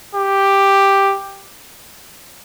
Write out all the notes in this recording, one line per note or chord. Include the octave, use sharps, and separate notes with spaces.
G4